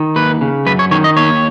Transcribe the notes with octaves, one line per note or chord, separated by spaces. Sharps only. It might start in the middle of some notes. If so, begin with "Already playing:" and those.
Already playing: D#3
D#2 B4
C#3
F#2 B4
C#5
D#3 C#5
D#5
D#2 C#5